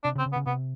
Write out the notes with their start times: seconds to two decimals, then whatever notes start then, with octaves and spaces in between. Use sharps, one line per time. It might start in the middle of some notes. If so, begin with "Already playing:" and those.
0.04 C3 D4
0.15 C#3
0.19 C4
0.26 C#3
0.33 B3
0.36 C#3
0.46 C3 B3